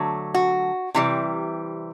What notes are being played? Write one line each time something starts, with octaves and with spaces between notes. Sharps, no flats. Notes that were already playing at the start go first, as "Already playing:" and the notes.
Already playing: D3 F#3 A3
F#4
C3 E3 G3